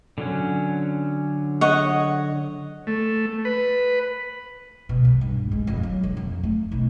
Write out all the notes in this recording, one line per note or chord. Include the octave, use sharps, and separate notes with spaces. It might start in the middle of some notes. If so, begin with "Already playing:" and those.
D3 F#3 C#4
C#5 D#5 F#5
A3
B4
B2
C2
G2
G#3
F2
F#3
D3
F2
A3
B1